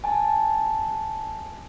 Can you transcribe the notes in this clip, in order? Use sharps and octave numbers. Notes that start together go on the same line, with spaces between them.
G#5 A5